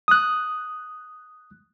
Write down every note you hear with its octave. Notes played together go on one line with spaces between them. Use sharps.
D#6 F#6